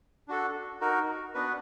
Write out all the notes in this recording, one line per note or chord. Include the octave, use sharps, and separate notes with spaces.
D4 F#4 A4
D#4 F#4 A#4
B3 D4 F#4 B4